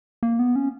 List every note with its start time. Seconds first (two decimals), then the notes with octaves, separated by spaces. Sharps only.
0.23 A#3
0.39 B3
0.56 C#4